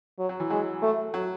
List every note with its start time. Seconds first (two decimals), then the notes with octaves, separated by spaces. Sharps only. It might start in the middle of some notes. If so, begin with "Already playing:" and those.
0.19 F#3
0.29 F#3
0.40 E3
0.50 F#3 G#3
0.82 A3
1.14 F#3